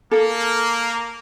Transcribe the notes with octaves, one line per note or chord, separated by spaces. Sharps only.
A#3 A4